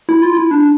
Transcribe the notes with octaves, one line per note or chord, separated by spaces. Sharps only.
E4
F4
E4
D4